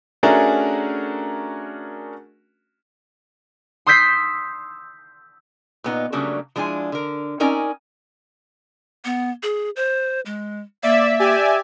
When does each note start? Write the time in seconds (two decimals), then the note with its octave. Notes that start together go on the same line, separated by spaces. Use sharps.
0.23 A3 C#4 D4 F#4 G#4 A#4
3.87 C6 D#6 E6 G6 B6 C7
5.84 A#2 B3 D#4
6.12 C#3 F#3 G3 A3 A#3 D4
6.56 F3 G#3 D4 E4 G#5
6.92 D3 A#4
7.40 C4 C#4 D#4 A#4 D5 G#5
9.05 B3
9.43 G#4
9.76 C5
10.26 G#3
10.83 A#3 D5 E5
11.19 G4 D5 G#5